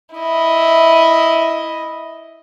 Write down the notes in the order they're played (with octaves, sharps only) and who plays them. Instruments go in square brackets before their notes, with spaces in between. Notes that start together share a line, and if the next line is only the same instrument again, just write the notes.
[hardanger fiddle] E4 D#5